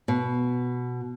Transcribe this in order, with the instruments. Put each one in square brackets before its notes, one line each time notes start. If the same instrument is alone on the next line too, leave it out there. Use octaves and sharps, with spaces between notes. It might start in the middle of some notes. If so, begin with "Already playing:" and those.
[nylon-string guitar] B2